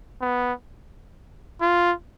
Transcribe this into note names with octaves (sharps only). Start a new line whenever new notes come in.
B3
F4